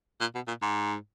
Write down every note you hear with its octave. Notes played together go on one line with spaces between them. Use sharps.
A#2
B2
A#2
G#2